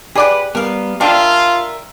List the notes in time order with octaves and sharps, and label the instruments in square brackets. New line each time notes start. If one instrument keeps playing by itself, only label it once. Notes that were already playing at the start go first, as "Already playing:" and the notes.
[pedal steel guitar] G4 B4 [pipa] G#4 D5 F#5
[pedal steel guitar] G3 B3 [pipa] A#4 F5
[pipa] G3 D4 [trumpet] F4 [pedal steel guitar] A#4 E5